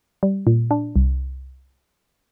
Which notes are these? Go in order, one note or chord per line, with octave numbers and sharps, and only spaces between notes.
G3
A#2
D4
C2